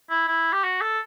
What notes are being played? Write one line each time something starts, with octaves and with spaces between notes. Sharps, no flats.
E4
E4
G4
F#4
A4